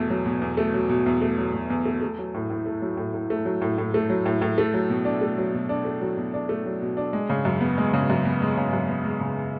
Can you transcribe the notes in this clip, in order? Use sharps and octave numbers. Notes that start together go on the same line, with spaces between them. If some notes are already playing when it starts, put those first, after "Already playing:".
Already playing: E2 B2 A3
F#3
B2
E2
A3
F#3
B2
E2
A3
F#3
B2
E2
A3
A3
F#3
A2
A2
A3
F#3
A2
A2
A3
F#3
A2
A2
A3
F#3
A2
A2
A3
F#3
B2
D4
A3
F#3
B2
D4
A3
F#3
B2
D4
A3
F#3
B2
D4
G#3
C#3
F#2
B3
G#3
C#3
F#2
B3
G#3
C#3
F#2
B3
G#3
C#3